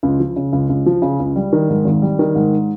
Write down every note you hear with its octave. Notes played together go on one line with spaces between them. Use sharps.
C#2
F3
C#3
C#2
C#2
F3
C#3
C#2
G3
D#3
G#2
G#1
G3
D#3
G#2